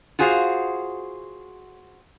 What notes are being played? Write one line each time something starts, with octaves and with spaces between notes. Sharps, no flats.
F4 F#4 G#4 C5 E5 F5